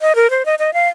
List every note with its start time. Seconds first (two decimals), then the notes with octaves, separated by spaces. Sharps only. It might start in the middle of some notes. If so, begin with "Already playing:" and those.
0.01 D#5
0.15 A#4
0.30 C5
0.45 D#5
0.59 D#5
0.74 F5